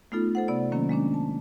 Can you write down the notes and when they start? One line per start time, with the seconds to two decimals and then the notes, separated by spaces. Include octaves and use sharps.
0.12 A3 B3 D#4 F4 A4
0.35 A4 C5 F#5
0.48 C3 B3 D5
0.72 D#3 F#3 A#3 C#4
0.89 G#3 A#3 C#4 D4
1.14 A5